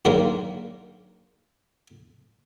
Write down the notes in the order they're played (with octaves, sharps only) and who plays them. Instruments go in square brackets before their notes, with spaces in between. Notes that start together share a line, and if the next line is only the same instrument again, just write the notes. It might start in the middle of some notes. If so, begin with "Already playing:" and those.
[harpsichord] G2 D#3 F#3 G#3 A#3 A#4